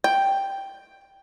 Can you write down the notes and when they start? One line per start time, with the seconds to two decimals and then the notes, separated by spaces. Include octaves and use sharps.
0.04 G5